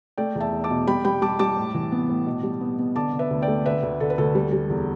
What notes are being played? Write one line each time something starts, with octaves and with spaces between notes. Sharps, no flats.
A3 D5 G5
E2
E5 A5
E2
A5 D6
B2
G3 G5 B5
G3 G5 B5
G3 A5 D6
G3 A5 D6
A2
E3
B3
A2
B2
G3
B3
B3
D3 A5 D6
D3
B4 E5
D2
D5 G5
A3
D3 B4 E5
D2
D3 A4
B4
D2 A4
G3
G3
E2